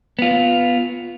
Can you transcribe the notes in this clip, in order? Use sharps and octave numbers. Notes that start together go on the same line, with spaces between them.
B3 F4